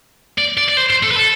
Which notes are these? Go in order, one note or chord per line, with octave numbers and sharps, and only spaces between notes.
D5
D5
D5
C5
C5
A4
B4
A4